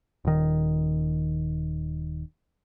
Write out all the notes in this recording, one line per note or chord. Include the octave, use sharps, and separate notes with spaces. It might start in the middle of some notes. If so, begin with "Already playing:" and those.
D#1 D#3